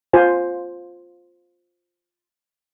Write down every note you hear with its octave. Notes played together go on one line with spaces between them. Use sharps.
F4 C5 G#5